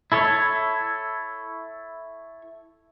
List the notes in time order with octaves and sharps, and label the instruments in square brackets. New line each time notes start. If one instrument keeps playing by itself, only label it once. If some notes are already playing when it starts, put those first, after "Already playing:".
[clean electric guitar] E4 A4 C#5